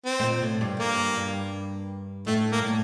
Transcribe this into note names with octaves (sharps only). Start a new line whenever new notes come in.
C4
A2
A#2
A2
G2
G2 A#3
G2
A2 A3
A#3
G2
A2